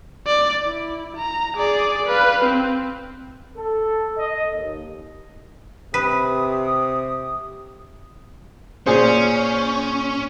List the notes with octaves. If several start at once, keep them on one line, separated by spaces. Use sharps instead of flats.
D5
E4
A#5
G#4 D5
B4 F5
C4
A4
D#5
D#2
C3 B4 D#6
A#2 C#4 G#4 C5